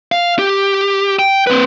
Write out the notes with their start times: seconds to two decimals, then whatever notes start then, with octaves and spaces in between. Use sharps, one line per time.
0.12 F5
0.39 G4
1.19 G5
1.47 C4 B4